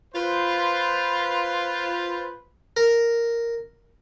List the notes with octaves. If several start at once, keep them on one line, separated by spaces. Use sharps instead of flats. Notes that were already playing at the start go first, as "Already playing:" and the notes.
F4 B4 C5
A#4